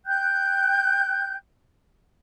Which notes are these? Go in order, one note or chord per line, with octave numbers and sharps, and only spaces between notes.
G5 F#6 G6